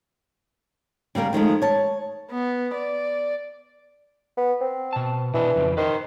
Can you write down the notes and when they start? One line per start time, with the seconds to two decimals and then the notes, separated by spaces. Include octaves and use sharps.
1.15 C#3 G3 A#3 A#4
1.33 D#3 F3 G#3 A3
1.62 C#5 A5
2.31 B3
2.74 D5
4.37 B3
4.61 C4
4.93 B2 A5
5.34 B2 E3 D4 D#5
5.56 F2 C#3 C4
5.77 D#3 B4 C5 D#5